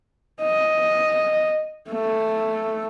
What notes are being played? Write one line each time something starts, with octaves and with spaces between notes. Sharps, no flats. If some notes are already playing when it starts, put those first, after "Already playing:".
D#5
A3